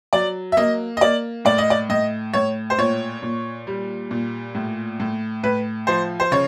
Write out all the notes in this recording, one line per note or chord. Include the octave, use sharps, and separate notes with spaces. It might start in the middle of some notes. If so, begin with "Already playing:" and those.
F#3 D5
E5
A#3 D#5
D#5
A#3 D5
A2 D5
D#5
D5
A2 D#5
A2 C#5
C5
A#2 C#5
A#2
G3
A#2
A2
A2
A2 B4
F3 C5
C5
C#3 C#5